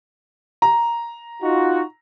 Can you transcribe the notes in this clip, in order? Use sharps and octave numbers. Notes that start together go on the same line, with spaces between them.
A#5
D#4 F4 F#4